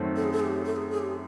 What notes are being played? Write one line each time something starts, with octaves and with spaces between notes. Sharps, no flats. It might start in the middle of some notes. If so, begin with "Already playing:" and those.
Already playing: F#2 D#3 F#3 A3 C4
A4
G#4
A4
G#4
G4
A4
G#4
G#4
G4